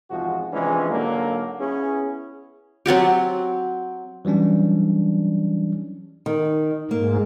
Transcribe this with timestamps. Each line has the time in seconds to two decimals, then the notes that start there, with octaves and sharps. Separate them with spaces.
0.11 E2 G#2 C3 F3 G#3 F#4
0.53 C3 E3 F3 G#3 C#4 D4
0.91 G#2 D3 F#3 A#3
1.60 B3 C#4 E4 G#4
2.86 F#3 C4 F#4 G4
4.25 E3 F#3 G3 C#4 D4
6.26 D#3
6.91 G#2 A#3